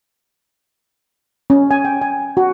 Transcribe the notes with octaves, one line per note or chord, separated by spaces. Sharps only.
C#4
G#5
G5
G#5
F#4